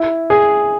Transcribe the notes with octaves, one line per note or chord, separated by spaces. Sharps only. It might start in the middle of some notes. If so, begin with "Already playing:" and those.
Already playing: E4
G#4